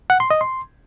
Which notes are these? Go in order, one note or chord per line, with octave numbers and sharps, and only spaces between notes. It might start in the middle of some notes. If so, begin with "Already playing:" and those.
F#5
C6
D#5
C6